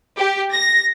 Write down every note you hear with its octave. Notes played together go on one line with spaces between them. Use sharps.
G4
A#6